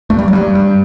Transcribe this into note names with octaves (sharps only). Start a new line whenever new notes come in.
G2 A3
G3
F#3
G2 G3
G2